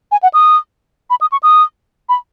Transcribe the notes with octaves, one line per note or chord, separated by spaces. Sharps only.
G#5
F#5
D#6
B5
D#6
C#6
D#6
B5